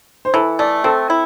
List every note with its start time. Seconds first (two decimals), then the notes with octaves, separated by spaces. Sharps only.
0.25 C5
0.34 E3 A4
0.59 A3 D5
0.84 C4 A4
1.10 E4